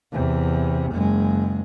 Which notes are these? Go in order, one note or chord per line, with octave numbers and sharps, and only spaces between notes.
E2 C3
F#1 G#3